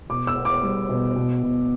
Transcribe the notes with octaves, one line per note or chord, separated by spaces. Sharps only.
B2 D6
E6
B3
D6
G3
B2
B2
B2